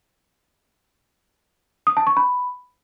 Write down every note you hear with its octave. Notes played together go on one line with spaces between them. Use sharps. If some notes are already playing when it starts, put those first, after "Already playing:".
D#6
A5
C#6
B5